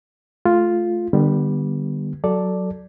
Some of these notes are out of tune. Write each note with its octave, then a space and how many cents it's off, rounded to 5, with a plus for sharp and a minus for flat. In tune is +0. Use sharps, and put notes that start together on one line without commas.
A3 -20 F4 +0
D3 +30 G3 +0 B3 -20
F#3 +0 A4 +0 D5 +0